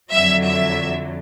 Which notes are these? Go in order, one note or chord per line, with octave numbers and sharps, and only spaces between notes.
F2 D3 F#3 E5
E5